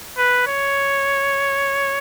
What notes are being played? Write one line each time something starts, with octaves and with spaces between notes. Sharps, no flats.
B4
C#5